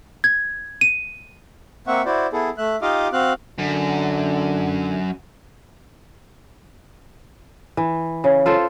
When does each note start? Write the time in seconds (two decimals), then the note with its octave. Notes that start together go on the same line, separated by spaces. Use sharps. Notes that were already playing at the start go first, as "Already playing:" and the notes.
0.24 G#6
0.81 D#7
1.87 A#3 C4 E5 F#5 C#6
2.05 E4 F#4 C5 D5
2.33 B3 E4 G#4 A4
2.58 A3 E5 F#6
2.82 D#4 F4 G4 D#5 F5 D6
3.13 C4 F#4 F5 F#6
3.59 F#2 D3
7.77 E3
8.24 C#3
8.46 F4 A4 C5